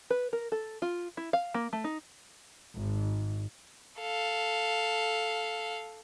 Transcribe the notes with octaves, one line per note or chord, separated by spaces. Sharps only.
B4
A#4
A4
F4
E4
F5
A#3
A3
D#4
G#1
A4 F5